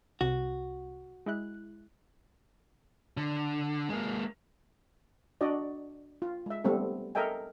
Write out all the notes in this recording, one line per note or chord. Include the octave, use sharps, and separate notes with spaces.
C2 C3 F#4
G#3 E4 F#6
D3
G#3 A#3
D4 F#4 D5 D#5
F4
G#3 E5
G3 A3 B3 C4 A4
A4 A#4 D#5 E5 G5 G#5